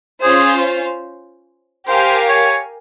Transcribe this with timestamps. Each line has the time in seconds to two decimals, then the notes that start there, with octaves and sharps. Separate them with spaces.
0.23 C#4 F4 G#4 C5
1.87 G4 A#4 C5 F5 G#5
2.29 C#5